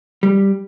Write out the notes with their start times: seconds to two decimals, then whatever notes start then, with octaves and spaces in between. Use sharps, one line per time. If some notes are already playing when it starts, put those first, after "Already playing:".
0.23 G3